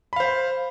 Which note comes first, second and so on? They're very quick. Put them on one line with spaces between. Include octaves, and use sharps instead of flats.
B5 F5 C5